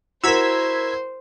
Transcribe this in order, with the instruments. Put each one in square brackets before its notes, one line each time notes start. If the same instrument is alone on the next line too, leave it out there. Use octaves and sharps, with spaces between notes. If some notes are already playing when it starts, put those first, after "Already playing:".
[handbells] E4 A#5 [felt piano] F#4 A#4 [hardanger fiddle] C5 [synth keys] E6 G#6 B6